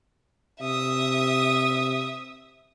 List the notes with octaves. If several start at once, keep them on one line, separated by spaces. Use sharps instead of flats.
C3 E5 D#6